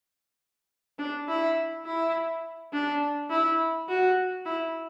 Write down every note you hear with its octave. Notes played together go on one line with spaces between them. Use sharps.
D4
E4
E4
D4
E4
F#4
E4